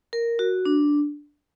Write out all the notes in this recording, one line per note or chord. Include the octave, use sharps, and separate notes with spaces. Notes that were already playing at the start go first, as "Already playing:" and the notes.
A#4
F#4
D4